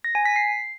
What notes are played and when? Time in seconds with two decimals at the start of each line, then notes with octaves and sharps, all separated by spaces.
0.04 A#6
0.15 G#5
0.25 B6
0.36 C7